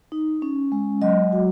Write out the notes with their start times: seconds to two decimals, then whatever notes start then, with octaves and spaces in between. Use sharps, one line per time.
0.12 D#4
0.42 C#4
0.72 G#3
1.02 F#3 D#5
1.33 F#4